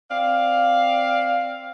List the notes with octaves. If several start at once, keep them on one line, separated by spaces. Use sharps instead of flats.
C4 D5 F5